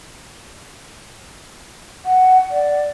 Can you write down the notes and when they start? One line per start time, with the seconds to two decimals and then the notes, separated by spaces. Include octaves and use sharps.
2.06 F#5
2.51 D5